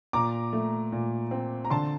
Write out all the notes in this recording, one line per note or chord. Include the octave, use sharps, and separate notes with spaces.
A#2 A#5 D6
A3
A#2
C4
A#5
D3 A5 C6